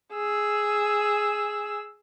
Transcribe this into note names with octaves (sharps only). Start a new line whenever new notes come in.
G#4 E6